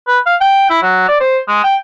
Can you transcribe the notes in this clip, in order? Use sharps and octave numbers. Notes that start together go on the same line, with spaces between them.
B4
F5
G5
E4
F#3
D5
C5
G#3
G5